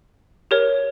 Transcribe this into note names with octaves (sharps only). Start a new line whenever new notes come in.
G4 A#4 C#5